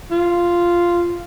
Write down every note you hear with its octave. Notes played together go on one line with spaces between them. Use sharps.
F4